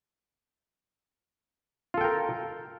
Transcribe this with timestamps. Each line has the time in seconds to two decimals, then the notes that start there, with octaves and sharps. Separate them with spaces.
1.94 F4
1.98 A4
2.01 G5
2.04 A#4